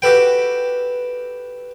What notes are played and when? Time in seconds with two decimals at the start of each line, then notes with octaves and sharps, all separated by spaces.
0.02 F#4 G4 A4 B4 G5